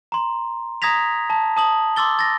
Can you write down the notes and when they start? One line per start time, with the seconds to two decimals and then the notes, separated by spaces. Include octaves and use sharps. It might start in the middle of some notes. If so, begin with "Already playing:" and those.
0.12 A#5 C6
0.82 A#5 D#6 G#6 A#6 B6 F7
1.30 A5
1.57 A5 D#6 F#7
1.96 C6 D6 E6 A6 G7
2.19 A6 A#6